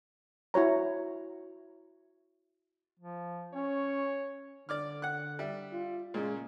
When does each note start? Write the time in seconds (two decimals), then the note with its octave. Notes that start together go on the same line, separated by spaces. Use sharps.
0.54 E4 F#4 C#5 A#5
3.00 F3
3.54 C#4 C#5
4.69 D3 D5 D6 F6
5.02 F#5 F#6
5.39 G3 E5
5.73 F4
6.14 A#2 C#3 G#3